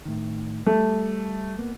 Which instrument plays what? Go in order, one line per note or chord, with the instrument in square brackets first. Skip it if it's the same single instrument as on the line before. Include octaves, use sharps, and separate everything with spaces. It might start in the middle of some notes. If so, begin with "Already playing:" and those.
[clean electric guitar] A2 D#3
[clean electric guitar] G3 [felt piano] A3
[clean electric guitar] A#3 B3